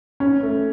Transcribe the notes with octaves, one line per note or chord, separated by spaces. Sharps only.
C#4
A3